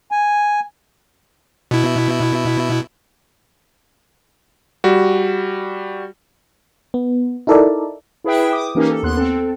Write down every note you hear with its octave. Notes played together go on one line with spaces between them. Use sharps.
G#5
B2 E4
G3 F#4
B3
D#4 E4 A4 A#4 D5 E5
E4 G#4 B4 E5 G5
D6 D#6
E3 A#3 C#4 D#4 G4 A#4
A4
D#2 B3 C6 F#6
C4 A4